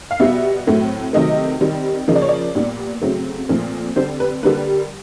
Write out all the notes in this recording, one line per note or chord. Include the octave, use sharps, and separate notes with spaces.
F5
B2 G3 B3 E5
A2 F#3 A3 C4
C3 D#3 F#3 A3 D#5
D#3 G3 C4
C#3 F3 A#3 D#5
D5
C#5
D5
A#2 G3 B3
C#3 F#3 A3 C4
A#2 F3 A3 C4
D3 G3 C4 C5
B4
D3 G3 A#3 B4